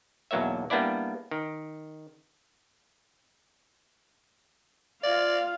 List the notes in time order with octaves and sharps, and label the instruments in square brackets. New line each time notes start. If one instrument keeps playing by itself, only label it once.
[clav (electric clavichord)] B1 E2 F#3 A#3 C#5 E5
G3 A#3 B3 D4 E4 D5
D#3
[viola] F4 F5 [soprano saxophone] D5